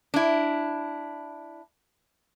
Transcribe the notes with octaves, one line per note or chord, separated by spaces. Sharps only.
D4 E4